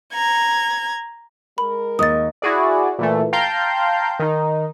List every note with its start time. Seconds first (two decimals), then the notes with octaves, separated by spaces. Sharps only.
0.13 A#5 G#6
1.58 G#3 A#4 B5
1.99 D#2 D#5 D#6 A6
2.42 E4 F#4 G#4 D5
2.99 A#2 E3 A3
3.33 F5 G5 A5 A#5 C6 G6
4.19 D#3 D#4